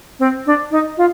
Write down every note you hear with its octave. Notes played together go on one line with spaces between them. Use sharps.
C4
D4
D#4
F4